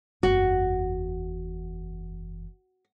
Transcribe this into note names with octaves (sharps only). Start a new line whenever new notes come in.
F#1 E2 F#4